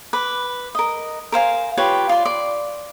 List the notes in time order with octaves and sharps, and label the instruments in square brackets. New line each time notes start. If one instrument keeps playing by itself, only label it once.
[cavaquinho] B4 D6
A#4 D#5
A#4 C5 F5 G#5
F4 G4 B4 C#5
F4 D5 C6
D5 C6